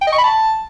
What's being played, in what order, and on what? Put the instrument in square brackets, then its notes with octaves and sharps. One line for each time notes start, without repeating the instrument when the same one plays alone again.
[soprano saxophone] G5
D#5
C#6
B5
A5